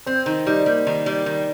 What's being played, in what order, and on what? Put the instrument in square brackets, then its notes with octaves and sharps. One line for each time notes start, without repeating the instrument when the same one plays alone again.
[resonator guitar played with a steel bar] C4 [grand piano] C5
[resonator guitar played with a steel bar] D#3 [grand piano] D#4
[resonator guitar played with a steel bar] G3 [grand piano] D#4
[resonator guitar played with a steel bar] G3 [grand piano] A#3
[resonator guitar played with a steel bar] D#3
G3
D#3